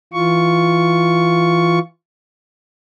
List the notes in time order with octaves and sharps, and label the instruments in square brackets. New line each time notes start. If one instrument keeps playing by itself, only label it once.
[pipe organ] E3 F4 C#6